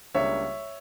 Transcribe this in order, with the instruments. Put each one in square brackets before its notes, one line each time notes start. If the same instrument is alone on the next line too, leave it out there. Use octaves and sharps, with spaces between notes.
[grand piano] C#2 C#3 G3 A#3 D4 C#5 E5